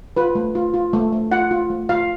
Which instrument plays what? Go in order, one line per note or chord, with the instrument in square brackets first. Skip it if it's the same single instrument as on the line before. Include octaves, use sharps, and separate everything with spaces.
[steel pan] F4 B4
A3
F4
F4
A3
A3
F4 F#5
F4
A3
F4 F5